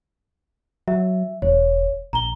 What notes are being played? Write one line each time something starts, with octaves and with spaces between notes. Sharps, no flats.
F#3 E5
E1 C#5
A#1 A#5 G7